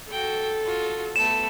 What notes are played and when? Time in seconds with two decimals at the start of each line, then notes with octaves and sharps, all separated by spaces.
0.11 F#4 A4 G5
0.64 F4 F#4
1.16 A3 B3 E7